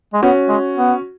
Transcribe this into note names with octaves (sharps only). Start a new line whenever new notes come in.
G#3
B3 C#4 F#4
G#3
B3